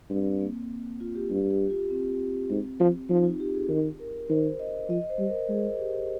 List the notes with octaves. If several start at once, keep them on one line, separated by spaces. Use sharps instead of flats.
G2 C4
A#3
F4
G4
G2 G4
G4
F4
C4
G#2
F3
F3 D#4
F4
G4
G#4
D#3
A#4
D#3 C5
D#5
F3 D#5
C5
G3
A#4
G#3 G#4
G4